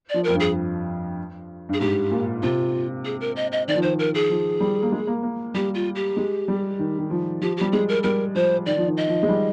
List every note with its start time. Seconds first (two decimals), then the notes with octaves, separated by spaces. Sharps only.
0.10 F3 D5
0.24 F2 A#4
0.35 G2
0.40 G#4
1.69 G2 G#4
1.80 G#2 G4
2.11 A#2
2.43 C3 F4
3.05 G#4
3.21 A#4
3.36 D#5
3.52 D#5
3.68 D#3 D5
3.76 F3
3.82 D#3 C5
3.99 A#4
4.15 G#4
4.30 F3
4.60 G3
4.82 A#3
4.92 G#3
5.07 A#3
5.23 A#3
5.54 G3 G4
5.75 F4
5.95 G4
6.17 G#3
6.48 G3
6.79 D#3
6.98 D#3
7.10 F3
7.42 F3 G4
7.57 G3 G4
7.72 G#3 G#4
7.89 A#4
8.03 G3 A#4
8.35 F3 C5
8.66 D#3 D5
8.77 F3
8.87 D#3
8.97 D#5
9.08 F3
9.23 G#3
9.29 G3